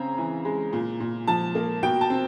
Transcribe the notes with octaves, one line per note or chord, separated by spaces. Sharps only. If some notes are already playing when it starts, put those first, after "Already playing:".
Already playing: C#3 C4 A#5
E3
G#3
A#2
A#2
F3 A5
A#3
B2 G5
A5
C4